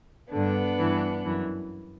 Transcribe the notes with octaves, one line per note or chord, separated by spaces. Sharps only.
G2 D3 B3 D4
G2 E3
F#2 E3